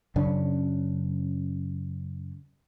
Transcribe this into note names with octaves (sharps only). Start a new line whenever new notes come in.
F#2 C#3 C#4 D4